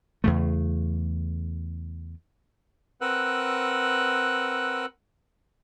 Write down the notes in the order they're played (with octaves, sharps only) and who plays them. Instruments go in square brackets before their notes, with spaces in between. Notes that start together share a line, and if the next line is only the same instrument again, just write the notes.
[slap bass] E2 C#3 A3
[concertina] C4 A#4 B4 F#5 E6 F#6